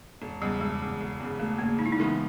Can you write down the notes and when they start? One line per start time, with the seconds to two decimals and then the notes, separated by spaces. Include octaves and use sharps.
0.22 E1
0.42 E2 C#3 G3
0.60 E1 G#3
0.81 E2 C#3
1.01 E1
1.20 E2 C#3
1.39 E1 A3
1.58 E2 C#3 A#3
1.78 C#2 D#4
1.86 E4
1.92 D#4
1.98 C#3 E3 G#3 B3 E4
2.08 D#4